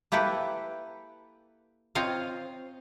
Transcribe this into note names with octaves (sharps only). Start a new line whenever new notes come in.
A#3 E4 G4 A4 B4
C4 F4 C#5 D#5 F5